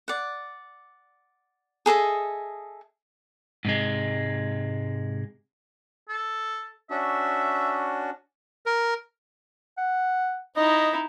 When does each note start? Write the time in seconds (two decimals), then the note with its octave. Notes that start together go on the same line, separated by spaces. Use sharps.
0.08 D5 F#5
1.86 G#4 A4 D#5 E5
3.65 G#2 C3 G#3
6.09 A4
6.90 C#4 D4 F#4 E5
8.66 A#4
9.77 F#5
10.56 D#4 E4 D#5